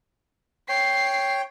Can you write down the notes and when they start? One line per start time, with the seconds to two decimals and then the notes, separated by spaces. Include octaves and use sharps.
0.69 C#5 G5 C7